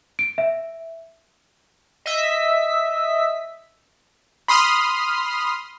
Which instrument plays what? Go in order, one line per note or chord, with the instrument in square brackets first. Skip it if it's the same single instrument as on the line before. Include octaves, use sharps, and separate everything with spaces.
[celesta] D7
E5
[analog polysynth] D#5 E5 B6
[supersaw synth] B5 C6 D#6 F6